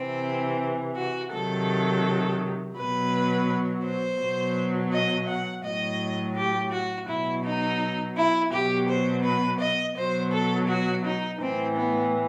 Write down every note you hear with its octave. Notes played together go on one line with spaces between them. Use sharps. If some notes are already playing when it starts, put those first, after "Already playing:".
Already playing: C3 E3 C4
F#4
C3 D#3 F#3 A4
B2 F#3 B4
C5
B2 F#3
D#5
F#5
A2 F#3 D#5
G4
F#4
B2 F#3 E4
D#4
E4
B2 F#3 G4
C5
B4
D#5
B2 F#3 C5
A4
F#4
D#4
A2 E3 C4
B3